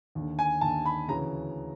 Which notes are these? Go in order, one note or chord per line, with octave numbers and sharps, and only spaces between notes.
D#2 D3
G#5
D#2 D3 A5
B5
D2 C#3 E3 A#5